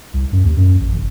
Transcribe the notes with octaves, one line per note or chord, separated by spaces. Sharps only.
C2
F#2
D#2
F#2
A1
F1